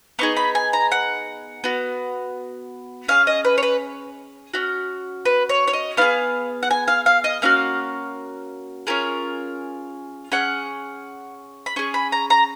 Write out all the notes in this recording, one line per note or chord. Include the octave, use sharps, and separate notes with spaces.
B3 D#4 G#4 C#6
B5
G#5
A#5
F#5
B3 F#4
C#4 G#4 F5
D#5
B4
C#5
B4
C#4 F#4
B4
C#5
C#5
D#5
B3 D#4 G#4 F5
F#5
G#5
F5
F5
D#5
A#3 C#4 F#4 F5
C#4 F4 G#4 A#4
C#4 G#4 F#5
B5
C#4 G#4 C#6
B5
A#5
A#5